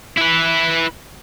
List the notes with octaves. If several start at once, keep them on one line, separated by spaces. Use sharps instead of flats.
E4 B4